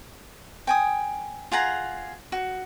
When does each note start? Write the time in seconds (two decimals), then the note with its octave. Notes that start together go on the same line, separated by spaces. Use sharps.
0.67 G5 G#5 D#6
1.52 F4 G#4 F#5 A#5
2.32 F#4